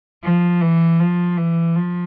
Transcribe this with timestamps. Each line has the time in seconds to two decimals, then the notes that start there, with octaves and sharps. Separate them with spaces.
0.23 F3
0.61 E3
1.00 F3
1.37 E3
1.76 F3